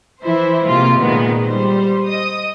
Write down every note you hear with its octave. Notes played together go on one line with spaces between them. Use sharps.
E3 E4 C5
C3 G#3 A#3 F4
A#2 D#3 G#3 B3
G3 C5
D#5 D#6